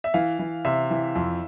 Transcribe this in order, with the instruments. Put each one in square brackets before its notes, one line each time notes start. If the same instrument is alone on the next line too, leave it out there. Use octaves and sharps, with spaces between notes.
[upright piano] E5
[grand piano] E3 [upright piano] F5
[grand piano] E3
[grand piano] C3 [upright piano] E5
[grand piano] E3
F2